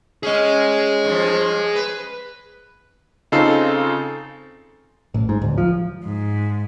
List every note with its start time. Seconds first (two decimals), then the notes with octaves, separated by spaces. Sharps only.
0.23 C#4 G#4 D#5
1.05 G2 F3
1.75 B4
3.32 C#3 C4 D#4 F4 A4 C7
5.14 A1
5.29 G#2
5.42 D1
5.58 F3
6.04 G#2